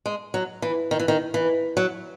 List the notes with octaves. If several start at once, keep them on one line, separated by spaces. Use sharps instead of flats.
G#3
F#3
E3
D#3
E3
D#3
E3
F#3